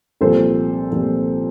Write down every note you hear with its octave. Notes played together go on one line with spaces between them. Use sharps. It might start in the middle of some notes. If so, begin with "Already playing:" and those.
C2 A#2 F3 A4 C5
C2 A#2 F3